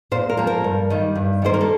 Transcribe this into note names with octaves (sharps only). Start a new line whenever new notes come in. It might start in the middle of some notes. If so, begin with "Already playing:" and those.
A#2 C5
A#4
F3 A#3
A#4
G2
D#3 G3 A#3
G2
D#3 G3 A#3 C5
A#4
A4